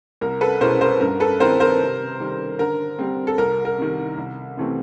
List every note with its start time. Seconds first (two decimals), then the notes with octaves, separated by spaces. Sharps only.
0.21 C2 A#4
0.41 A4 B4
0.61 B2 G#3 C#4 E4 A#4 C5
0.81 A#4 C5
1.01 G2 A#4
1.20 A4 B4
1.40 D#3 G#3 C4 E4 A#4 C5
1.60 A#4 C5
1.80 C3
2.20 D#3 G3
2.59 D3 A#4
2.99 G3 C4
3.27 A4
3.38 C2 A#4
3.65 A#4
3.78 C3 D#3
4.17 C2
4.57 C3 E3 A3 C4